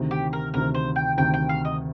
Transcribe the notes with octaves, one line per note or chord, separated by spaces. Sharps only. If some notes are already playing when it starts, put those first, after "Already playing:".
Already playing: D2 C3 D#3
G4
A#4
D2 C3 D#3 A#4
C5
G5
D2 C3 D#3 G5
G5
F5
D#5